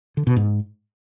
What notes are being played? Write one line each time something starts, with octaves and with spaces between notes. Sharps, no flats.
D3
B2
G#2